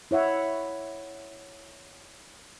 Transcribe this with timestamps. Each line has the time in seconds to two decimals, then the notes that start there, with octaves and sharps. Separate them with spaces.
0.11 E4 C#5 E5 F#5